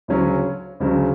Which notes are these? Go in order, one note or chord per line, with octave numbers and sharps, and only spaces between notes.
D2 C#3 F#3 C#4
D2 C#3 F#3 C#4